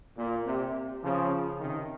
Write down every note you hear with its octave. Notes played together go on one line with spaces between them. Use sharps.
A#2
C3
C#3 F3
C3 D#3